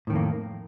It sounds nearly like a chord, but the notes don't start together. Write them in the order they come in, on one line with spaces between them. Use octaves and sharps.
A2 D#3 F2 A#3